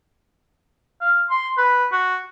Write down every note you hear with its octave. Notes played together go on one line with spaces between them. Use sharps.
F5
C6
B4
F#4